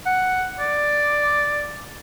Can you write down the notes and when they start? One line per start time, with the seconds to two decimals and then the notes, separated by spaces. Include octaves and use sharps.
0.06 F#5
0.60 D5